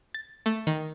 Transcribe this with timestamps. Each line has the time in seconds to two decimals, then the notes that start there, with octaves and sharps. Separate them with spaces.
0.14 A6
0.46 A3
0.67 D#3